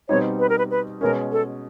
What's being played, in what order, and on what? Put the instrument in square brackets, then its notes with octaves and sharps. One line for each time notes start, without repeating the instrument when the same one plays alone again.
[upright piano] B2 G3 C4 D#4 [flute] C#5
[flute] B4
A#4
B4
B4
[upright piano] B2 G#3 C#4 [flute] A#4
[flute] A4